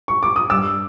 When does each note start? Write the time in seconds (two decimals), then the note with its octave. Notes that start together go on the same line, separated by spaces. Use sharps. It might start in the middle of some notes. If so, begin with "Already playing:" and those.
0.08 C#6
0.23 D6
0.36 D#6
0.50 G2 D6 E6